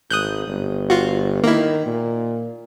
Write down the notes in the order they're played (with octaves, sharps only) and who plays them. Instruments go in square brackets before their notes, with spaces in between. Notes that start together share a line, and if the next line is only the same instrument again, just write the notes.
[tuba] G#1 [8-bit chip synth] D#6 F#6 G6
[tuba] G1
[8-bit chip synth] F4 F#4
[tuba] D#3 [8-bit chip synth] A#3 E4
[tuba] A#2